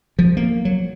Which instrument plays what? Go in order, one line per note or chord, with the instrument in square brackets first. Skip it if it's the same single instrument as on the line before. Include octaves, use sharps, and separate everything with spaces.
[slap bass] F3
A#3
F#3